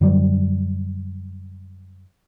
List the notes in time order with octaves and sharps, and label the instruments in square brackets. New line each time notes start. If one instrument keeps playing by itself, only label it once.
[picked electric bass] F#2 D3 F#3 G3